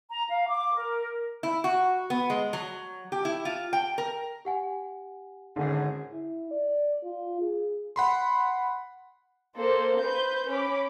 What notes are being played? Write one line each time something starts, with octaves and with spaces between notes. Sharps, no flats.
A#5
F5
D6
A#4
E4
F#4
B3
G#3
F#3
G4
E4
F4
G5
A#4
G4 F#5 G#5
G#1 D3 C#4 G#4
E4
D5
F4
G#4
F#5 B5 C6
A#3 A4 C5
B4 C5 G6
C#4 B5 D6